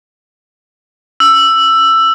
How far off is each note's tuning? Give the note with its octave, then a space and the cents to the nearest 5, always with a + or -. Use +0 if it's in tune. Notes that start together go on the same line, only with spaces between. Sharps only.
E6 +10